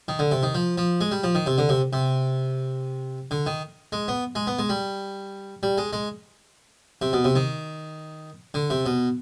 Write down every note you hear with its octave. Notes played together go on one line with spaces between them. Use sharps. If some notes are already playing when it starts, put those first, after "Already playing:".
D#3
D3
C3
D#3
F3
F3
G#3
G3
F3
D#3
C3
D3
C3
C3
D3
D#3
G#3
B3
G#3
B3
G#3
G3
G3
G#3
G#3
C3
B2
C3
D#3
D3
C3
B2